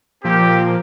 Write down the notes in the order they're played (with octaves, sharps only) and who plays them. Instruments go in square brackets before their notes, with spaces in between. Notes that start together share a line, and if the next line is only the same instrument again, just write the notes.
[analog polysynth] A#2 F3 A#3 [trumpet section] C4 G4